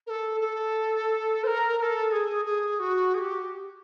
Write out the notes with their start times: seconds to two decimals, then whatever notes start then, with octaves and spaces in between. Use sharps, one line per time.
0.07 A#4
0.10 A4
0.40 A4
1.44 C5
1.47 A#4
1.78 A#4
1.82 A4
2.12 G#4
2.45 G#4
2.79 F#4
3.14 G#4
3.19 G4